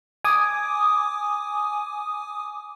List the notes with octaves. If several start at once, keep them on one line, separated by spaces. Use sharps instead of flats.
G#5 D6 D#6